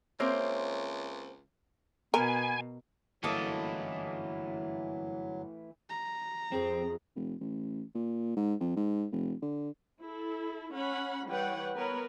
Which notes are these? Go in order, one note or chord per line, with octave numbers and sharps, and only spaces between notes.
C#2 A#3 C4 C5 C#5 E5
B2 B3 A#4 G#5
G1 F#2 E3 F#3 A3 A#3 A4 D#5
A#5
F2 C4 G#4
F1
A1
A#2
G#2
F2
G#2
F1
D3
E4 A4
C#4 F#5 B5
E3 G3 B4 C#5 F#5 G5
B3 A#4 B4 C#5